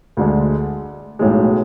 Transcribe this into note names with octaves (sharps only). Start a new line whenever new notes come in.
D2 D3 G#3
B1 A2 E3 G#3